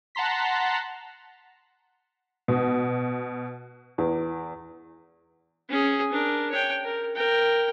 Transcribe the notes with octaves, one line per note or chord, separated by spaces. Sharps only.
F#5 A5 A#5 C6 B6
B2
E2
C#4 G#4
D4 A#4
C#5 G5
A#4
A#4 G5